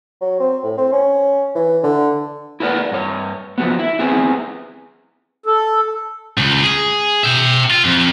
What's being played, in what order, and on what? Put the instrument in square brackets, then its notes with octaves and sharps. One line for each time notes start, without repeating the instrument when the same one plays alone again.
[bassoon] F#3
C4
A2
C4
C#4
E3
D3
[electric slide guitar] E4 A#4 B4 D5
G2 C#5
F3 F#3 B3
E4
B3 C4 E4 G#4
[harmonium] A4
[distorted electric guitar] C#2
G#4
E5 G5
F4
F2